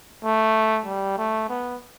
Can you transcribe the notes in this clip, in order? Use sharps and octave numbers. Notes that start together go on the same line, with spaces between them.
A3
G3
A3
B3